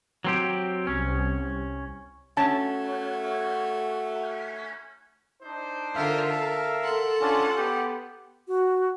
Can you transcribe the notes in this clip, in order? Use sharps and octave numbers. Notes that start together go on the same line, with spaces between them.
F#3 C4 G4
C2 C#4
A3 C#4 F#4 A5
D4 D#4 C5
D3 F4 A#4 E5 F5
A4 A#4
A4 F#5 C6
C#4 D4 F4 G#5 A5
B3 G4
F#4